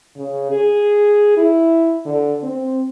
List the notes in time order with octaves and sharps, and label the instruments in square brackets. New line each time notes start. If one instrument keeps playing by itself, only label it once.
[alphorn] C#3
G#4
E4
D3
C4